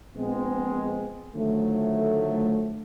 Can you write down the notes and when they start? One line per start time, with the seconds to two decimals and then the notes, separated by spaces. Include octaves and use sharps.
0.17 A#1 G#3 B3 C4
1.36 D3 D#3 F3 F#3 A3